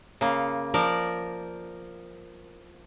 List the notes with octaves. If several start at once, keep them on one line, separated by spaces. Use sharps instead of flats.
C#3 A#3
F3 A#4 D5